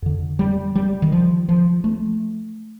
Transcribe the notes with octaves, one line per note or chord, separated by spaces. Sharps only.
F2 D3
G3
G3
D#3
F3
F3
A3